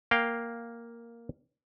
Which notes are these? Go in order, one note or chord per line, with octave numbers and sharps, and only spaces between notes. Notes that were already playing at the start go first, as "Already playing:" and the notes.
A#3 F5 G5